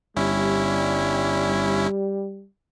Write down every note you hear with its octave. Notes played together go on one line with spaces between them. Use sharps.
G1 G3 C#4 E4